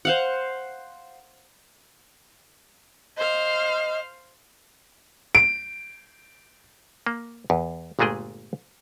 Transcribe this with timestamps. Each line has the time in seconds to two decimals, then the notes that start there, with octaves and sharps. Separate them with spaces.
0.05 C5 F5 F#5
3.17 C5 D#5 F5
5.35 D7
7.07 A#3
7.50 E2
7.99 G1 A#2 G#3 A3 G#4 G5